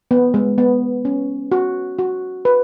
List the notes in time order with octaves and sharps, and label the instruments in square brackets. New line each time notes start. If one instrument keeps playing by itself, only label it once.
[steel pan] B3
G#3
B3
C#4
F#4
F#4
B4